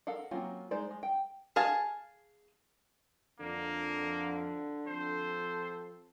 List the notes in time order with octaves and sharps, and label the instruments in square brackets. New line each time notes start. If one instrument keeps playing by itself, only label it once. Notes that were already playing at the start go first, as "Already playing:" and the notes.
[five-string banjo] A4 A#4 F5 F#5
F#3 A#3 C4 C#4 F4
G#3 D#4 C5 D5
G#3
G5
G#4 F5 G#5 A5
[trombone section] F2 F3 [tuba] D3 [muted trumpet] A#3
[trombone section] F3 C4 A4 [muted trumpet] C5